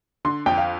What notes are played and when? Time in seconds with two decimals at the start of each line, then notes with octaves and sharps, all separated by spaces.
0.25 D3 C6
0.46 F2 G5
0.58 F5